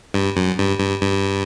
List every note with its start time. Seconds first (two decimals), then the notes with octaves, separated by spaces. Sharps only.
0.14 G2
0.36 F#2
0.58 G2
0.79 G2
1.01 G2